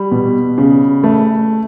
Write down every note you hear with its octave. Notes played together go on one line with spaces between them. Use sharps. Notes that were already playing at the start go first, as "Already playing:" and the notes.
Already playing: G3 B5
B2
C#3
A3